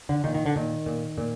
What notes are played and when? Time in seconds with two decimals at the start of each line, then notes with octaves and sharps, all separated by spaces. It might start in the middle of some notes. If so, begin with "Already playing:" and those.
0.09 D3
0.24 A#2 D#3
0.34 D#3
0.46 D3
0.56 A#2 D#3
0.86 A#2
1.18 A#2